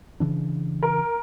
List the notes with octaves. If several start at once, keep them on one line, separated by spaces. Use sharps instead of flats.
C#3 E3 D4
A#4